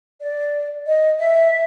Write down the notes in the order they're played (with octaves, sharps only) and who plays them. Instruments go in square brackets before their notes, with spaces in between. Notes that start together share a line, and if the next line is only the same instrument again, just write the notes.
[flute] D5
D#5
E5